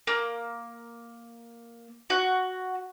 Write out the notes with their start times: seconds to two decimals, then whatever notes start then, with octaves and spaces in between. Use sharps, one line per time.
0.07 A#3
2.10 F#4